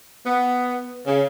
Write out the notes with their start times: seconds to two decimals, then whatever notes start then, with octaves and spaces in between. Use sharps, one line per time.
0.24 B3
1.07 C#3